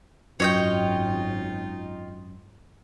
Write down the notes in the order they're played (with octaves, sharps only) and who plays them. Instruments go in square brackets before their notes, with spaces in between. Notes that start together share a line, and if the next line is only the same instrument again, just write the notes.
[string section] G#1 [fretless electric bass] F#2 [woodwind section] D#4 F4 [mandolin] C#5 D#5 G5